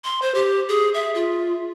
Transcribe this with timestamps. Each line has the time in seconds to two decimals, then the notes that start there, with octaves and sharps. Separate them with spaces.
0.05 C6
0.22 C5
0.35 G4
0.69 G#4
0.94 E5
1.15 F4